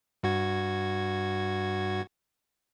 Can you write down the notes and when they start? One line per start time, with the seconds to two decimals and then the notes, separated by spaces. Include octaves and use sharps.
0.23 G2 F#4 G#6